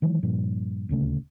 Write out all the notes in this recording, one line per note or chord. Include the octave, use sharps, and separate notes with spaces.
D#3 E3 F#3 G#3
G2 A#2 F3
D#1 D2 C#3 A3